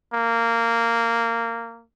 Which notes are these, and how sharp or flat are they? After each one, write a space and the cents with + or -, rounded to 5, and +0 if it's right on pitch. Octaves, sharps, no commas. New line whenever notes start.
A#3 -15